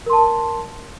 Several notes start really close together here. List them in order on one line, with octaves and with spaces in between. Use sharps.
A#4 C6 A5